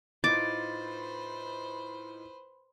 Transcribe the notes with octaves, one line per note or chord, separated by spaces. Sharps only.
A2 D#4 F4 B4 C5 D6 A6